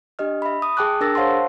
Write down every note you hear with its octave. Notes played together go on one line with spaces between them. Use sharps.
D4 G4 D#5 F6
E5 B5
D#6
G#4 G5 A5 D6 F#6
D4 G#4 A#4 E6 A6 A#6
C5 C#5 F5 F#5 A5 C6